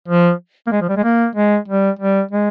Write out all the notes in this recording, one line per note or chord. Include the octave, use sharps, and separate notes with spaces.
F3
A#3
G#3
F3
G3
G#3
A#3
G#3
G3
G3
G#3